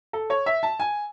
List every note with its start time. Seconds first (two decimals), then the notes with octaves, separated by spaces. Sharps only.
0.13 A4
0.30 C#5
0.46 E5
0.63 A5
0.80 G#5